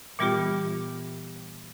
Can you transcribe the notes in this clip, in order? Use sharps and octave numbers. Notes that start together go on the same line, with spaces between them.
A#2 E3 G3 B3 F4 G4